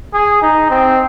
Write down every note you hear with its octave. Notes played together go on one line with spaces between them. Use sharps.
G#4
D#4
C4